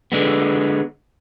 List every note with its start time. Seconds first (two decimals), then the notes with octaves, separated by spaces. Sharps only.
0.12 D3 G#3 B3